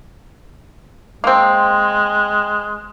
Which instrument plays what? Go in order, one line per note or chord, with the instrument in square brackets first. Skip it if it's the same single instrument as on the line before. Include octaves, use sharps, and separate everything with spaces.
[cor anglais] G#3 [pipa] A#3 C4